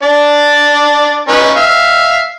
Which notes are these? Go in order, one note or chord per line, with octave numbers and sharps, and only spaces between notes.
D4 D5
C#4 D#4 B4
E5 F5